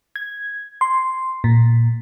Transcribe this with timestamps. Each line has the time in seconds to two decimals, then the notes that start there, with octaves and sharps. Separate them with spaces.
0.16 G#6
0.81 C6
1.44 A#2